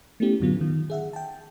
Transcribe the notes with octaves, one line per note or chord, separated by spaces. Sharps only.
A3 B3 C#4 E4 G4
F#2 A2 D3 F#3 B3 F4
D#3
G#4 E5 F#5
G5 A5